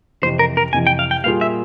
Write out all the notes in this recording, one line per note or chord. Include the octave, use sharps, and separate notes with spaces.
F2 C3 E3 C5
A#4
A#4
F2 C3 E3 G#5
G5
F5
G5
A#2 G3 A#3 F4 G#4 F5
E5